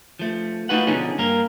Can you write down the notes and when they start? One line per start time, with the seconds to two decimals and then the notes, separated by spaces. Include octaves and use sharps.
0.19 F3 A3
0.69 A3 D#4 F4 F#4 B4 F#5
0.87 B2 D3 F3 C#4 D#4 G#4
1.18 G2 A#3 A#4